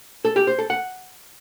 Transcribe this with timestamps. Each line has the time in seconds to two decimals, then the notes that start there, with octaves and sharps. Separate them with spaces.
0.25 A4
0.36 G4
0.47 C5
0.59 A4
0.70 F#5